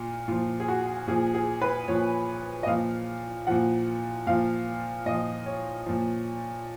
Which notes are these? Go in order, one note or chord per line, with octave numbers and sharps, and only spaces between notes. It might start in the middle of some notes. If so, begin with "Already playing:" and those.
Already playing: A#2 F4
A#2 F3 F4
G#4
F#4
A#2 F3 G#4
G#4
B4
A#2 F3 C#5
D#5
A#2 F3 F5
A#2 F3 F#5
A#2 F3 F5
A#2 F3 D#5
C#5
A#2 F3